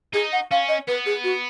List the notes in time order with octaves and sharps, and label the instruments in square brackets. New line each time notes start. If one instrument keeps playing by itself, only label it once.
[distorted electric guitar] D#4 [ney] G#4
[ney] F#5
[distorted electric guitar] C#4 [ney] F5
[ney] D#5
[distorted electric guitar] B3 [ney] B4
[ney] G#4
F#4